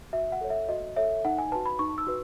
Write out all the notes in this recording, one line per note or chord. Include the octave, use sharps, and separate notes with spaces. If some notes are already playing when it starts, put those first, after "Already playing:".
F#4 E5
F#5
A4 C#5
E5
F#4 D#5
A4 C#5 E5
D#4 F#5
G#5
F#4 B4 A5
B5
D#4 C#6
E6
F#4 B4